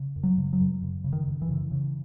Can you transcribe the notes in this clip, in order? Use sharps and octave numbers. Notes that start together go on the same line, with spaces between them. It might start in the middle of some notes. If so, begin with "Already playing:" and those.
Already playing: C#3
F#2
F#3
C#3
F#3
F#2
C#3
C#3
D#3
F#2
E3
C#3
C#3